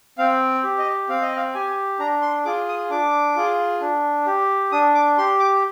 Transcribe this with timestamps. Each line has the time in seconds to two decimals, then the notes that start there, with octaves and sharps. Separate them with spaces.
0.18 C4 F5
0.63 G4
0.78 D#5
1.09 C4 F5
1.22 D#5
1.36 F5
1.54 G4 G#5
1.99 D4 A#5
2.22 C6
2.45 F4 G#4 D6
2.68 D#6
2.90 D4 D6
3.36 F4 G#4
3.81 D4
4.26 G4
4.72 D4 D#6
4.95 D6
5.18 G4 C6
5.40 D6